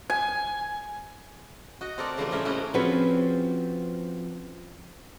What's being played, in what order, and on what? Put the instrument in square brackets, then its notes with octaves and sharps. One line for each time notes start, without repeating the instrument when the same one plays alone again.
[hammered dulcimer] G#5
[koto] F#4 D#5
C4 A4 A#4 D5
C#3 E3 F3 G3 A3 C4
A2 F3 C#4 A#4 E5
A3 A#3 C#4 E4 F#4 D#5
[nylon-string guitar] F3 C4 C#4 F#4 G#4 B4